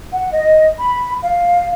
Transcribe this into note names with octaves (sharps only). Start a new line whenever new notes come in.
F#5
D#5
B5
F5